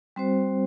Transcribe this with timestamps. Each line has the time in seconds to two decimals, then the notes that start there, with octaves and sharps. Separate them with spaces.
0.16 G3 C4 F#4 C5